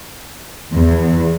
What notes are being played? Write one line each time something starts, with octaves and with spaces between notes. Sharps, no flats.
E2